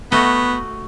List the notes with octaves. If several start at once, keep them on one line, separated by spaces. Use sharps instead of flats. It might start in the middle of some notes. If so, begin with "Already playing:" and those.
A3 B3 F#4 D#5